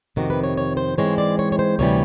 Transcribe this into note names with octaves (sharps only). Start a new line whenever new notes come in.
F2 C3 D#3 F#4
B4
C#5
C#5
C5
G#2 E3 G#3 C4 C#5
D5
C#5
C#5
C5
D2 C3 E3 G3 C#5